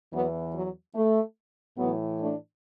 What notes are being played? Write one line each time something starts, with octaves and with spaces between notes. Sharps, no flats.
E2 E3 F#3 B3
F#3
A3
A2 E3 F#3 B3
A3 D4